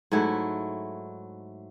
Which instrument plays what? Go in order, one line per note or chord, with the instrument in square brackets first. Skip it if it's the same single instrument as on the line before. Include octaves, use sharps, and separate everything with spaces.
[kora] G#2 F#3 A3 E4